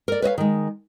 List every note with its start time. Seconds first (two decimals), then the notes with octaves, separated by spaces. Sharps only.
0.08 A#4 D5
0.22 B4 C#5 D#5 F5
0.38 D#3 G#3